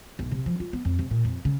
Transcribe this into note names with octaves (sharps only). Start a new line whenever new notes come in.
B1
C3
F3
F4
B3
F2
C3
A#2
F2
C#3